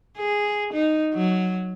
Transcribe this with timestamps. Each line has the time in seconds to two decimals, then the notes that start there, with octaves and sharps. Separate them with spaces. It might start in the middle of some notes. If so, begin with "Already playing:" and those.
0.17 G#4
0.73 D#4
1.14 F#3